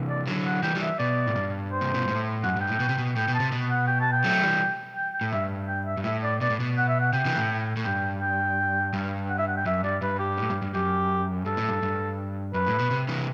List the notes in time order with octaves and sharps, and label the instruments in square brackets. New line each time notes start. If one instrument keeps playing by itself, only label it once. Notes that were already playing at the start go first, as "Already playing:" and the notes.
Already playing: [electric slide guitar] C3 E3
[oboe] D5
[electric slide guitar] D3 F#3
[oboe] F#5
[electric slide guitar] E3 G3 [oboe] G5
[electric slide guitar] E3 G3
[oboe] E5
[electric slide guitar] B2 [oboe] D5
[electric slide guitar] A2
G2
[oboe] C5
[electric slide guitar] C3
B2
A2
[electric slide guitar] F#2 [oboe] F#5
[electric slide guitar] G2 [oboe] G5
[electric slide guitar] A2
B2
C3
B2
[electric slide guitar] A2 [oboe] G5
[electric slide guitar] B2
[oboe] A5
[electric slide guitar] C3
B2
[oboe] F#5
G5
A5
G5
[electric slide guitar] F#3 A3
E3 G3
[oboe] G5
G5
[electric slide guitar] A2
[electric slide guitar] G2 [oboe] E5
[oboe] G5
E5
[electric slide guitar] G2
[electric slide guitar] A2 [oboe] E5
[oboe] D5
[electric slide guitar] B2 [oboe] D5
[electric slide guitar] A2
B2
[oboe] F#5
E5
F#5
[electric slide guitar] C3 [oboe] G5
[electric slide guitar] C3 E3
A2
A2
[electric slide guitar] G2 [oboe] G5
[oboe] G5
[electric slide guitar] G2
[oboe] F#5
E5
F#5
G5
[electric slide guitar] F#2 [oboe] E5
[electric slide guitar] G2 [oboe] D5
[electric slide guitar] G2 [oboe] B4
[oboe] G4
[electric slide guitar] A2
G2
G2
[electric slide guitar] F#2 [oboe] G4
[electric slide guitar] G2 [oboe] A4
[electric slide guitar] A2
G2
G2
[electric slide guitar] F#2 [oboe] B4
[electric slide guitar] A2
B2
C3
C3 E3